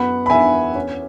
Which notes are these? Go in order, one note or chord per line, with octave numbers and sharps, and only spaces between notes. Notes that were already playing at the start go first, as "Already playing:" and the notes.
Already playing: F#2 B3 F#5 B5
B5
E2 E5 G#5
C#4